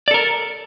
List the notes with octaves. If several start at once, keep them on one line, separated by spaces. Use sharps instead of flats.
A4 A#4 D5